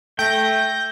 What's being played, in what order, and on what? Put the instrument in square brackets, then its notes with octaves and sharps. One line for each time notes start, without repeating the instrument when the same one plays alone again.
[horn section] A3 [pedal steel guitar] G5 [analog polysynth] G6 A#6